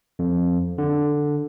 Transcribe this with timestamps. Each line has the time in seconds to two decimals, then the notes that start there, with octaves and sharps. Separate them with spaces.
0.19 F2
0.78 D3